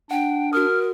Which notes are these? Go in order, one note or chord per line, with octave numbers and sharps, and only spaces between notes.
D4 F#5 G5
F#4 A#4 D#6 F6